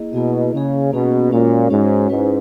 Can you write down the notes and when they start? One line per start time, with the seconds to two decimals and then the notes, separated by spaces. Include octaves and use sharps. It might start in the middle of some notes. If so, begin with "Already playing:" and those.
Already playing: A#3 E4 G#4 D#5
0.13 B2 A#3 E4 G#4 D#5
0.53 C#3 A#3 C#4 G#4
0.92 B2 A#3 C#4 G#4
1.31 A#2 G#3 C#4 F#4 C#5
1.70 G#2 G#3 C#4 F#4 C#5
2.10 G#2 G#3 C#4 E4 B4